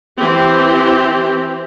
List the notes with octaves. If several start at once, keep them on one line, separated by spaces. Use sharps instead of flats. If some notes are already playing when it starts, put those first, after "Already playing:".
E3 C4 G4